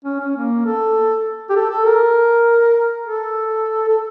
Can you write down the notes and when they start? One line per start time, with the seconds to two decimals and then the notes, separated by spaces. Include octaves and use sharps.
0.05 C#4
0.20 C#4
0.36 A#3
0.66 A4
1.50 G4
1.56 A4
1.70 A4
1.85 A#4
3.06 A4
3.88 A4